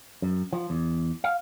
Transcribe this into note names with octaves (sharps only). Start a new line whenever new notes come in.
F#2
F3
E2
F5